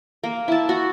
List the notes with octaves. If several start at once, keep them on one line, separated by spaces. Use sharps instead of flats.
A#3
E4 A5
F#4